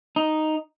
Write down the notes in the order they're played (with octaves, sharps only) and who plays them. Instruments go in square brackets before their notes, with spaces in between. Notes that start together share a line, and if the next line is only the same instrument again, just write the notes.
[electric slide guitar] D#4